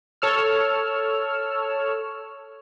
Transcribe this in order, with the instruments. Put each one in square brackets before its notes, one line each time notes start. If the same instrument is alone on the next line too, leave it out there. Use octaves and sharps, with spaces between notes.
[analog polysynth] A4 C#5 E6 F6